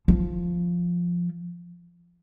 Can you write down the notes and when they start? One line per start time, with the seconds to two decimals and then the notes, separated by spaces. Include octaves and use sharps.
0.08 F3